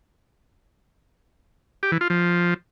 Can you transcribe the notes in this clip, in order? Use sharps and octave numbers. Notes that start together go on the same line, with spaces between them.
G4
E3
F4
F3